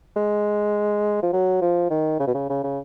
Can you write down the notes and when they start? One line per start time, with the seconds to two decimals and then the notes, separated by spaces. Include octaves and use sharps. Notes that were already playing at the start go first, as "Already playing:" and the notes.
0.16 G#3
1.23 F3
1.33 F#3
1.62 F3
1.90 D#3
2.20 C#3
2.27 B2
2.34 C#3
2.50 C#3
2.64 C#3